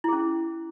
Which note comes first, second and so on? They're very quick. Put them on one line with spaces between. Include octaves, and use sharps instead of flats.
E4 G#4 C#4